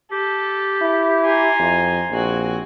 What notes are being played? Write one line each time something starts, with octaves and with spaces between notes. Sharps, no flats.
G4 A4
E4
G#5 A#5 C6
F2
A#1 C4 F#4 G#5